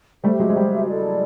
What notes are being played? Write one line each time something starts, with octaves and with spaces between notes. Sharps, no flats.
G3 A3 G4 C5 E5
F#3 G#3
G#3
G3
E4 A4 D5